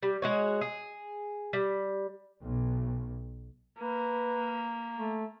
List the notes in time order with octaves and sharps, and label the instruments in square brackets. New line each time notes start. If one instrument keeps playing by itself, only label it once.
[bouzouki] G3
G#3 F#4 C#5
G#4
G3
[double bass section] B1
[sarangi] A#3 [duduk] B4
[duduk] A3